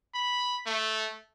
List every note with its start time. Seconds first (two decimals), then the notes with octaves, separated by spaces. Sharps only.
0.14 B5
0.66 A3